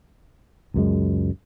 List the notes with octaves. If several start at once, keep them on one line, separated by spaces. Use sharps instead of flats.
C#2 F#2 G#3